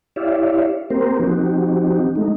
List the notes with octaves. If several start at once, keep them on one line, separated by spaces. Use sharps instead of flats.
E4 G4 C#5 D5 E5 F5
A#3 C4 G4 A#4 C5
F3 C4 D#4 F#4 G4
G#3 A3 D#4